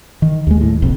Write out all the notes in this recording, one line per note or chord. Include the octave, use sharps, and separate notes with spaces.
D#3
D#2 G#3
A2
F1 A#1 F2